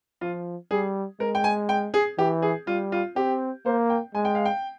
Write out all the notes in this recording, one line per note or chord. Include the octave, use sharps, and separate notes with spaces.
F3 F4
G3 G#4
G#3 A#4
G5
G#5
G5
G#4
E3 G4
G#4
G3 F4
F4
C4 G4
A#3 C5
G5
G#3 G#5
G5
F5
G5